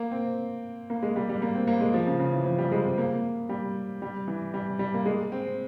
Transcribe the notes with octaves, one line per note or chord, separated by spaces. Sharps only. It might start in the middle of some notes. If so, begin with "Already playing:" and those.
Already playing: A#3
C4
A#3
G#3
G3
G3
A#3
C4
A#3
G#3
F3
C#3
C#3
E3
F3
G3
G#3
C4
A#3
G3
G3
E3
G3
G3
A#3
G#3
C4